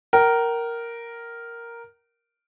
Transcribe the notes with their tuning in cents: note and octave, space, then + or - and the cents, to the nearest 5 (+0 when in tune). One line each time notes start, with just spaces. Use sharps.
A#4 +0 G5 -40